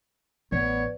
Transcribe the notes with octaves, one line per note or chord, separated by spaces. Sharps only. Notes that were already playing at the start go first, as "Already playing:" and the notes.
A1 B3 B4 C#5 D5